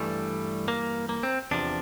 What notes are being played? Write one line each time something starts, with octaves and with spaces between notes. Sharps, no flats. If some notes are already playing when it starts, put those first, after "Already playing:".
Already playing: G2 E3 G3 A3
A#3
A#3
C4
E2 C3 F3 D4